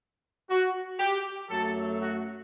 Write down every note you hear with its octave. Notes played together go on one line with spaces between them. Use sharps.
F#4
G4
F#2 F#3 A3 A4
F#4